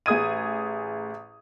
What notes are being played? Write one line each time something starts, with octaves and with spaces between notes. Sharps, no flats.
A1 G#4 D#6 G#6 D#7